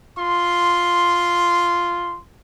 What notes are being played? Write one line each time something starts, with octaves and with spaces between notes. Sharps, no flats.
F4 C6